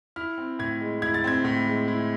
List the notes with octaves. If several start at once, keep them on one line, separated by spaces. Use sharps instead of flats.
E4 F6
C4
A2 G#6
G#3
E4 G#6
A6
C4 G#6
A2
G#3
E4